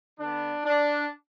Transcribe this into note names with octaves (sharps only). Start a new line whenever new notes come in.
D3 B3 D4
D4